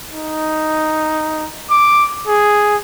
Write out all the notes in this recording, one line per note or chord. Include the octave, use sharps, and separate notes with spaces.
D#4
D6
G#4